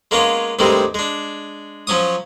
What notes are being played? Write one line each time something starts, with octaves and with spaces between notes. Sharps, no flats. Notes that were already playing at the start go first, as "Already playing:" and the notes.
G#3 A#3 B3 C#4 F4
D2 G2 D#3 G3 G#3 C4
G#3 D4
F3 F#3 C#4 C#6 D#6